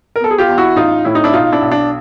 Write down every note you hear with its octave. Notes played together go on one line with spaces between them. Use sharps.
A#4
B3 A4
G#4
F4 G4
E2
E4 F#4
A1 D#4 F4
A2 E4
D#4
D4 E4
B1 D#4 F4
D4 E4
B1
D4